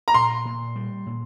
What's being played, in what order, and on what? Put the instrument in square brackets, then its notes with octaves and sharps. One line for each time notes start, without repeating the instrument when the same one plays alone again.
[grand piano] A#5
[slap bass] A#2 [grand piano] C6
[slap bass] A#2
G3
A#2